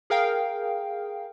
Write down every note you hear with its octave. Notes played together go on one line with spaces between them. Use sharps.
G#4 A#4 F5 G5